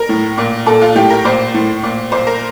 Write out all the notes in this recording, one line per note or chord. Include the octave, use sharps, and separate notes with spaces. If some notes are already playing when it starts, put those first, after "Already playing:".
Already playing: A#4
A2
A#2
A#2 A4
F4
A2 G4
A#4
A#2 C5
A2
A#2
A#2 C5
A#4